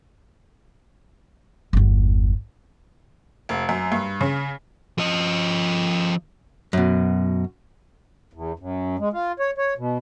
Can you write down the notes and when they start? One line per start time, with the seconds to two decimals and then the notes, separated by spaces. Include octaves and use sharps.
1.73 G1 E2
3.49 F1
3.69 F#2
3.92 G2
4.21 C#3
4.98 F3 D#5
6.73 F#2 B2
8.33 E2
8.59 F#2
8.99 G#3
9.13 F4
9.39 C#5
9.58 C#5
9.78 B2